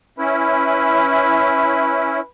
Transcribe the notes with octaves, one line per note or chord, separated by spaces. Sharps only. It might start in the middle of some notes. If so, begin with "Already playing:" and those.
C#4 E4 B4